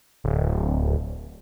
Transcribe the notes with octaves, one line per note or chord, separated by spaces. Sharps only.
D1